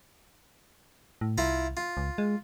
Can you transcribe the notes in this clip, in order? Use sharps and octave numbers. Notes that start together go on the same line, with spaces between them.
A2
C2 E4 F4 A#5
F4
C#2
G#3